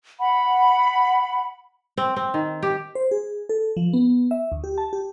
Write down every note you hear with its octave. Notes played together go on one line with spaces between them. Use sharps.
F#5 B5
C4
C4
D#3
G4
C5
G#4
A4
F3
B3
E5
D2
G4
A5
G4